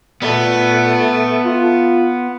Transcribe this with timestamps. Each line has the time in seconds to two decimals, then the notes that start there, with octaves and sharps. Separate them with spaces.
0.22 A#2 A3 B3
1.45 F4